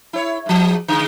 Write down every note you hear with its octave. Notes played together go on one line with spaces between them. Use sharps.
E4 C#5
G#2 F3
D3 G#3